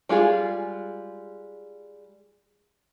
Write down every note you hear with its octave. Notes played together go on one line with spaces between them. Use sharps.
G3 G#3 F4 G#4